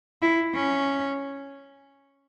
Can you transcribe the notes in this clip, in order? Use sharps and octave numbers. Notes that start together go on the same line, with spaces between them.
E4
C#4